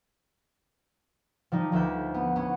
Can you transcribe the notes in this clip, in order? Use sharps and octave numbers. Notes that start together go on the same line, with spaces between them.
F3 G3 D#4
D2 F3 B4 E5 G6
B3
B3 C#4